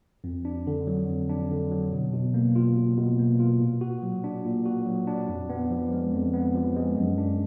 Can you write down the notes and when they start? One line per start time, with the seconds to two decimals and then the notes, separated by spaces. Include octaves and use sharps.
0.24 F2
0.45 D4
0.67 D3
0.87 F#3
1.09 F2
1.29 D4
1.51 D3
1.71 F#3
1.92 B2
2.13 B2
2.34 A#3
2.56 F4
2.77 B2
2.98 B2
3.19 A#3
3.40 F4
3.60 A#2
3.81 F#4
4.02 F#3
4.24 D4
4.45 A#2
4.65 F#4
4.86 F#3
5.07 D4
5.29 F2
5.49 B3
5.71 F3
5.92 G#3
6.13 F2
6.34 B3
6.55 F3
6.76 G#3
6.97 F#2
7.18 D4